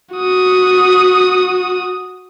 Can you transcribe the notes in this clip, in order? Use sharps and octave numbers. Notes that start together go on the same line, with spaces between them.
F#4 D#6